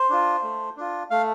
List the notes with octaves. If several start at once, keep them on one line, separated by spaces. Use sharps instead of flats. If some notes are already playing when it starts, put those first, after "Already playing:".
Already playing: C5
D4 F4
A3
D4 F4
A3 F5